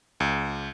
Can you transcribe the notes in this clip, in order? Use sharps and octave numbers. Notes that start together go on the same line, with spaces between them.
C#2